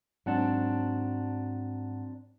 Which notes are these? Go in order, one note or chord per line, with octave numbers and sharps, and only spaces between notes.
G#2 F#3 C4 D4 F#5 A5